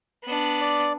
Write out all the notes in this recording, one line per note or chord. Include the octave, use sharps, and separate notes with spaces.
B3 D4
D5